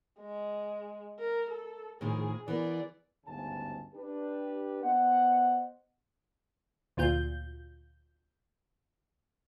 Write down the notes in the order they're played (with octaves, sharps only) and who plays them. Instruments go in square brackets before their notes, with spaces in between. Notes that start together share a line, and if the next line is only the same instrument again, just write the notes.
[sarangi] G#3
A#4
A4
[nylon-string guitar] A2 D#3 F3 [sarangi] G#4
[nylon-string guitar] E3 B3 A#4 [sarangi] D5
[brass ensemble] G1 D2 G#2 C#3 G#5 A5
D4 G4 B4
B3 C5 D#5 F#5
[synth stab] D2 A#2 F4 G6